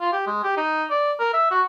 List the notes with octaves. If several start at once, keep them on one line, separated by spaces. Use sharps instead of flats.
F4
G4
G#3
G4
D#4
D5
A#4
E5
F#4